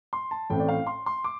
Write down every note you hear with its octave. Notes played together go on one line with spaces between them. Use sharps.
C6
A5
A1 A2 A3 C4 G5
D5
F5
C6
C6
D6